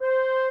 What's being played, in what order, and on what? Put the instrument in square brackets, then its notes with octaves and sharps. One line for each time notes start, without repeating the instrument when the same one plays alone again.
[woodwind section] C5